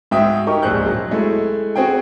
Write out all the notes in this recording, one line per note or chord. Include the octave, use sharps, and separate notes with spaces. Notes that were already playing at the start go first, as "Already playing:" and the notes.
G#2 G#3 F#4 E5 G5 D#6
D#4 G4 A#4 C#6
D1 A#1 G#2 C5 F#6 G6
F#3
G#3 A3 E4
C4 F#4 G#4 G5